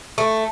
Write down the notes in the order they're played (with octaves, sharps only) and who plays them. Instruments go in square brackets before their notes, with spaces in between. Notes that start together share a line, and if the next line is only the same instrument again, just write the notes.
[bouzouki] A3